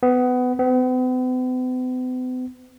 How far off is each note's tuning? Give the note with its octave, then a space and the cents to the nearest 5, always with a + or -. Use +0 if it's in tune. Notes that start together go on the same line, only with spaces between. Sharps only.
B3 +20
B3 +45